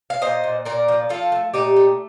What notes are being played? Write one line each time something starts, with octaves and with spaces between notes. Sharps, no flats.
F5
A#2 C5 D#5
A#2
A#2 A#4 D5
F3
F3 F4 A4
A3
A#2 D#4 G4
A3